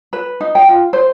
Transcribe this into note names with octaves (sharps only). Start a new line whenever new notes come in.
B4
D#4
G5
F4
C5